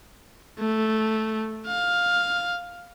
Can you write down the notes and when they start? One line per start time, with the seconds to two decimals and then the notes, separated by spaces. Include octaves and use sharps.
0.59 A3
1.67 F5